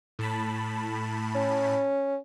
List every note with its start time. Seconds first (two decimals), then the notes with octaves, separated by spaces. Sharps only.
0.19 A2 A5 B5
1.35 C#4